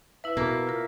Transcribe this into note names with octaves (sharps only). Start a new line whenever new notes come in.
E4 B4 E5
B2 A#3
F4 A#4